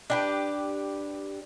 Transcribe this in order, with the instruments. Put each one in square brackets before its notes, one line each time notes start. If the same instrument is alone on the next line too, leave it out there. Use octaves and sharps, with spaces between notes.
[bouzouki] D4 G4 B4